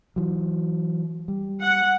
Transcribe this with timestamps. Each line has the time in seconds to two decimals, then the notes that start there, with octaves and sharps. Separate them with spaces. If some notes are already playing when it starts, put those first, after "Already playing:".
0.16 E3 F#3
1.28 G3
1.62 F#5